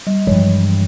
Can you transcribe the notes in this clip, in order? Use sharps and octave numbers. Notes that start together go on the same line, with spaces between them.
G3
G2 E3 F3 G#3